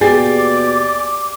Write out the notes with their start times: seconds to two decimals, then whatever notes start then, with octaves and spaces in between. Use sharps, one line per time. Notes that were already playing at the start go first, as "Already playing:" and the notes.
0.01 D#2 B2 G4 G#4 D5 D6 A6 C7